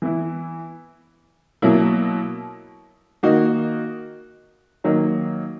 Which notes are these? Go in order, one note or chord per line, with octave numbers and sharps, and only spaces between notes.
E3 B3 E4
B2 F#3 A#3 E4
D#3 A#3 D#4 F#4
D#3 F#3 A#3 D#4